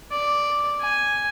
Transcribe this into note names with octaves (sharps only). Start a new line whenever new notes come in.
D5
G#5